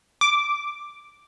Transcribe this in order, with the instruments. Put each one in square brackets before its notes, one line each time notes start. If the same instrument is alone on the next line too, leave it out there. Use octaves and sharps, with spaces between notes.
[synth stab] D6